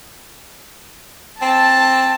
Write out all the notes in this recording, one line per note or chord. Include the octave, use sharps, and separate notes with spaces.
C4 A5